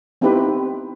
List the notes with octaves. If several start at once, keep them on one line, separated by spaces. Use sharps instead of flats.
B3 C4 D#4 E4 G4 B4